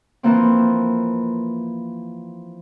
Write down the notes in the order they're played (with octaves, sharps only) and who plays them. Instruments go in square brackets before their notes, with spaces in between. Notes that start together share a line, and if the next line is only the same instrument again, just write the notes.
[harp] E3 F3 A#3 C4